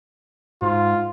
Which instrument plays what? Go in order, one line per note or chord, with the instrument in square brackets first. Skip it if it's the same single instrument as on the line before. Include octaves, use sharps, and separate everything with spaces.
[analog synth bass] G#2 [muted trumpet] F4